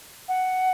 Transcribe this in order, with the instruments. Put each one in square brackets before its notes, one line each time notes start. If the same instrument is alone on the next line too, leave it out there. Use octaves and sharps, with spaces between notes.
[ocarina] F#5